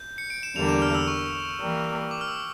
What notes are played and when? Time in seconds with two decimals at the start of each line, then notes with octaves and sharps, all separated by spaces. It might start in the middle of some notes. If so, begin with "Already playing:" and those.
Already playing: G6
0.18 C#7
0.30 D7
0.43 E7
0.55 E2 D3 G3 A#3 D4 F7
0.69 E7
0.82 F6
0.95 E6
1.08 C#6
1.60 E3 G3 A#3
2.11 D6
2.21 F6
2.28 E6